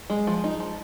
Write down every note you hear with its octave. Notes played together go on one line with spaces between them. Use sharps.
G#3
F3
D#4
F3